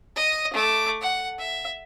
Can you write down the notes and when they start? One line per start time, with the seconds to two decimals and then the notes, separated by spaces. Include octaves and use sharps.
0.16 D#5 D#6
0.54 A3 D6
1.01 F#5
1.39 E5